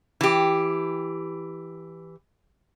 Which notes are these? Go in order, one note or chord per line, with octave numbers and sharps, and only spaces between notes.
E3 G4